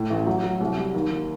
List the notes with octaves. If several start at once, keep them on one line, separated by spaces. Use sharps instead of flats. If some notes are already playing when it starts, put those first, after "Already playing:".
Already playing: A2
A1
F#3
F#3
C2
G3
D#2
D#2